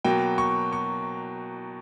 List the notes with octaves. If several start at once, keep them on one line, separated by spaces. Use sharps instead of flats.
B2 F#3 A#3 G5
C#6
C#6